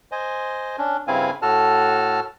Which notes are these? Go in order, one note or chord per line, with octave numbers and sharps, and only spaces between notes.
C5 D#5 G#5
C#4 D4
G2 C#3 C4 E4 F5 G#5
A2 F#4 A4 A5 F6